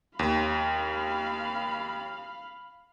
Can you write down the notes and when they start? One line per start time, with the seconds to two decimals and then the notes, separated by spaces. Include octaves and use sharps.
0.19 D#2 F5 B5